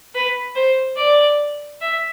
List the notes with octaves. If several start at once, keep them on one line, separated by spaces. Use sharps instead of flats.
B4
C5
D5
E5